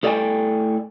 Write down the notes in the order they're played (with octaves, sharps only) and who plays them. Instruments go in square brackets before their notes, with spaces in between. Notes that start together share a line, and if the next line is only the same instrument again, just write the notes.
[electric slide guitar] A2 A4 D5 D#5 G5 G#5